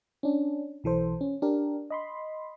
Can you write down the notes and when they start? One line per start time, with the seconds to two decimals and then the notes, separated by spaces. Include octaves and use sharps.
0.23 C#4 D4
0.84 B1 E3 A4 C5
1.21 C#4
1.42 D4 G4 A#4
1.90 D#5 B5 C6